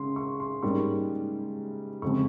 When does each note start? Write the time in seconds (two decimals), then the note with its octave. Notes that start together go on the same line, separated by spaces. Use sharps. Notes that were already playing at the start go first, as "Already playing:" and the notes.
Already playing: C#3 G#3 C#4 C6
0.16 C#6
0.40 C6
0.63 G#2 G3 A#3 C#4 C#6
2.02 F2 C#3 F3 G#3 C4 C#6